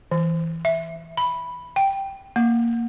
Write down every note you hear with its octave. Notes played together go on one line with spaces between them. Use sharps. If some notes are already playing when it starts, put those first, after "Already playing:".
E3
E5
B5
G5
A#3